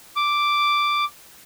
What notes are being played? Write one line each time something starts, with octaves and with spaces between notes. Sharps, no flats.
D6